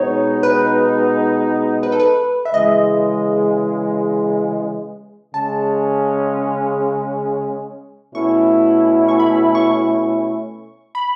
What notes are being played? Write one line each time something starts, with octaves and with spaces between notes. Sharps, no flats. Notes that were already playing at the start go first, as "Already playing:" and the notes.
Already playing: B2 G#3 B3 D#4 C#5
B4
B4
A4
B4
E5
C#3 E3 G#3 D#5
C#3 G#3 C#4 A5
B2 A3 C#4 E4 C#6
C#6
B5
C#6
B5